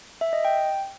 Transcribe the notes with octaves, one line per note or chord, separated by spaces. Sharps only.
E5
D#5
G5